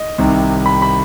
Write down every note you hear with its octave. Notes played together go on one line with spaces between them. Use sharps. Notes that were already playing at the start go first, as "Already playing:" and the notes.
Already playing: D#5
C2 C3 D#3
B5
B5